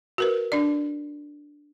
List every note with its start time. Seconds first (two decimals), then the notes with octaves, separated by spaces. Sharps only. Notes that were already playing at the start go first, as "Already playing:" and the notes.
0.18 F#4 A#4 B4
0.52 D4 D5